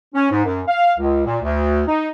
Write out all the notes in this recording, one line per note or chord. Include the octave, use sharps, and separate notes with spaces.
C#4
G#2
F#2
F5
C#2
A#2
D2
D#4